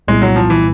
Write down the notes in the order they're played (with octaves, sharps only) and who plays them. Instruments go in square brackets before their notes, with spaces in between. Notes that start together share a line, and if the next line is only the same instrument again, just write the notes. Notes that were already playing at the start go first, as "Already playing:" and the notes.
[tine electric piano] C2 A#2 G3 B3 E4 [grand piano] G#3
[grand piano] F#3
F3
E3